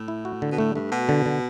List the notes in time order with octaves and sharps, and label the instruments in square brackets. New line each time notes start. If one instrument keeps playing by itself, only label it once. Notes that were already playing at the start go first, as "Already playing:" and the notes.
Already playing: [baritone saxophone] A2
[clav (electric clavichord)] E4
F#4
D3
[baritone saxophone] B2
[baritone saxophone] A2 [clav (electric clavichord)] A3
[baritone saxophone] G2 [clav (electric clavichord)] A3
[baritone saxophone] B2 [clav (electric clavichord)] F#4
[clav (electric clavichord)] D3
D3